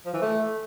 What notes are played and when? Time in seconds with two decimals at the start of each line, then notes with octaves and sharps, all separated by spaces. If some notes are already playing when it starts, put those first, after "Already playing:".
0.06 F3
0.14 E3
0.22 A3